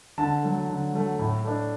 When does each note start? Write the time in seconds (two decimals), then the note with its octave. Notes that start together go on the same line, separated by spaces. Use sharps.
0.18 D3 A5
0.43 F#3 A3
0.68 D3
0.93 F#3 A3
1.19 A2
1.44 A3 D4